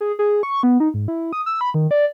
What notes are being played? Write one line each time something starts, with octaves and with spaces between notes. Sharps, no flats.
G#4
G#4
C#6
B3
D#4
G#2
E4
D#6
E6
B5
D#3
D5